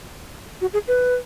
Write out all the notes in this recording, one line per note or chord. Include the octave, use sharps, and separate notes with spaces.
F#4
G#4
B4